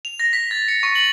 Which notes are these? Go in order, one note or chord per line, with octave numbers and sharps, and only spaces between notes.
F7
A#6
B6
A6
C#7
C#6
F#7